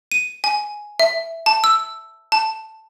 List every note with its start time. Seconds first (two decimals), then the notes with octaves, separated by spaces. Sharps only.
0.12 D#7
0.44 G#5
1.00 E5
1.46 A5
1.64 E6
2.32 A5